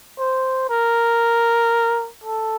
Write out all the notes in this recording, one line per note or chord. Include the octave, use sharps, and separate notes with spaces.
C5
A#4
A4